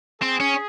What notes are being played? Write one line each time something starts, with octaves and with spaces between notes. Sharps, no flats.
C4 G#4
C#4